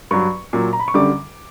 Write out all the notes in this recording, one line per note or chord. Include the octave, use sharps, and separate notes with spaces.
G2 F#3 C#6
A#2 F#3
A#5
B5
C#6
F#2 D3 G3 D6